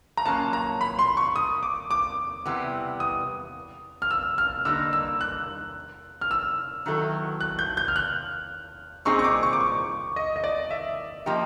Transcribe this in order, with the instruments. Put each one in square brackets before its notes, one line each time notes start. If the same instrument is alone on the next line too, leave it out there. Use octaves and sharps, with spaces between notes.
[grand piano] A#5
[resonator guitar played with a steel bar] A#2 F#3 A#3 C#4 [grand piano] A5
[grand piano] A#5
B5
C6
C#6
D#6
D6
D6
[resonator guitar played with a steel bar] C3 E3 G3 B3
[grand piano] D#6
F6
E6
F6
[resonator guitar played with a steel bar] D3 G3 A#3 D#4 [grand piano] E6
[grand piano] E6
F#6
F6
E6
[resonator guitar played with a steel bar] D#3 F#3 B3 E4 A4
[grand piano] F#6
G6
G6
F6
F#6
[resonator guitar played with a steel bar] A#2 G3 C4 D#4 G#4 [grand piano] C#6
[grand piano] C#6
D6
C#6
D6
C#6
D#5
D#5
D5
E5
[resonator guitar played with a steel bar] F3 A#3 D#4 G4